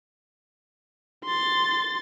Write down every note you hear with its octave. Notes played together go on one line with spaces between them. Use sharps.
C6 A6